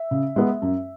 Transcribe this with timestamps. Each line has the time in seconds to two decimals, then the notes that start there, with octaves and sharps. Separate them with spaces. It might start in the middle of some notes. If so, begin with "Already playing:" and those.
Already playing: E5
0.11 C#3
0.36 G#3 B3
0.62 F#2